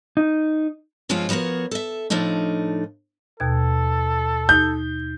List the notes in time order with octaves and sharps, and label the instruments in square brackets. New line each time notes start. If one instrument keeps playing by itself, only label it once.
[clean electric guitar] D#4
[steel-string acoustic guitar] G2 F3 G#3 C4 C#4 F4
F3 B3 F#4 A#4 C#5
A4 E5
A2 F3 A3 D4 D#4
[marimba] D#2 B2 G#6 [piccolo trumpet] A4
[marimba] D#4 [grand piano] G6